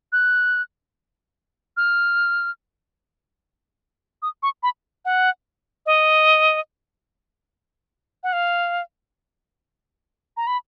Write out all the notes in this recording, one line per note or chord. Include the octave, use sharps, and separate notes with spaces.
F#6
F6
D#6
C#6
B5
F#5
D#5
F#5
F5
A#5
B5